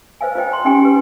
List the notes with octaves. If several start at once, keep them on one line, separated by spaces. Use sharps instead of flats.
B4 C5 D#5 F5 G#5
F4 C5 D#5 G5
D#5 A#5 C6
C#4 D#4 G4 G5 G#5 C6
G4 B4